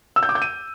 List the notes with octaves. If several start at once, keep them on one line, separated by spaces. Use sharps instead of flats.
E6
G6
D6
G6
D#7